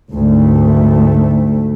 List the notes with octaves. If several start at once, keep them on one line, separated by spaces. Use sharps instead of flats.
D2 G#2 A3